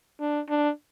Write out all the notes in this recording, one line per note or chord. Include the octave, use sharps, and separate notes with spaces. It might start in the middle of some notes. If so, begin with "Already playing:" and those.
D4
D4